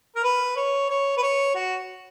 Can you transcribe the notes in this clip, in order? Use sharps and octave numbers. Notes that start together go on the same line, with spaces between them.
A#4
B4
C#5
C#5
B4
C#5
F#4